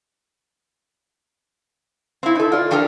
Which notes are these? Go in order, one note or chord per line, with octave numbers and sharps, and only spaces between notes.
C4 E4
D#4 A4
F4 D5
F3 D4 G4 A4 A#4